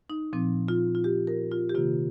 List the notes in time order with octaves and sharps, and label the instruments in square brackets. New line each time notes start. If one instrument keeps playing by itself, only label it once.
[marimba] D#4
A#2 F3 C4
F4
F4
G4
A#4
F4
G4
C3 D#3 A#3 F4